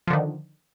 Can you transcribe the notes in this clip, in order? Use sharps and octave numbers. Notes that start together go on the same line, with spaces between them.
D3 D#3 F3